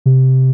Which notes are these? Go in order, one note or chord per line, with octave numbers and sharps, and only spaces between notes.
C3